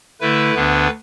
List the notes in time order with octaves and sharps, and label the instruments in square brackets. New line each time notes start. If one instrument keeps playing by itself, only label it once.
[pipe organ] D3 A3 E4 B4
D2 D3 B3 D4